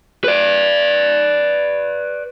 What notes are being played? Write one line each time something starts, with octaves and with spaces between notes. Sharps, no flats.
B4 D5